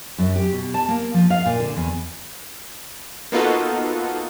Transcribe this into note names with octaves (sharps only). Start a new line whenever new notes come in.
F#2
G4
B2
A5
A#3
F3
F5
A#2
D3
E2
A#3 B3 D#4 F4 F#4 A4